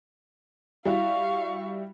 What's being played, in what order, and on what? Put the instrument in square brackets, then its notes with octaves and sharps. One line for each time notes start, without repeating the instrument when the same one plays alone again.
[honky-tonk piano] G3 E4 F#4 [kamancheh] F5 C#6